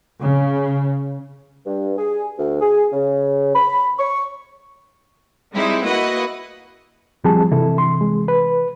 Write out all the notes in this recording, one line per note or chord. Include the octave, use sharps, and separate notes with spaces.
C#3
G2
G#4
D2
G#4
C#3
B5
C#6
G3 G#3 C4 D#4 E4
A#3 E4 F#4 B4 D#5 F#5
F3 G3 C4 G#4 A5
C3 E3 E4 A4
C6
G#3
B4